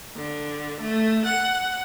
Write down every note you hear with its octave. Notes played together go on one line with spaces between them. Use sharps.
D3
A3
F#5